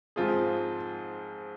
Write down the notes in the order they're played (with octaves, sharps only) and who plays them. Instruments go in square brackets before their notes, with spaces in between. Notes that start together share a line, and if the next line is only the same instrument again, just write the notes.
[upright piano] G#2 F3 C4 F4 G#4